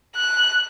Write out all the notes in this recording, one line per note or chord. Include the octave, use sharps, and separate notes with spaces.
F#6